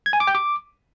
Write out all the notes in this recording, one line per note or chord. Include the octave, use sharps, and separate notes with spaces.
G#6
G#5
D6
G5
D6